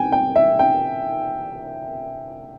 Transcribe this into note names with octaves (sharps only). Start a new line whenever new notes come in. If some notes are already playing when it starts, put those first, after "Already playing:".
Already playing: G5 G#5
G5
E5
G5